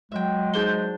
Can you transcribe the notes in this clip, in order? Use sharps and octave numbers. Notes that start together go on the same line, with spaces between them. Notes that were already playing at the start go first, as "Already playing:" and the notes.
F#3 G#3 E5 G5
D4 D#4 G#4 C5 G6 G7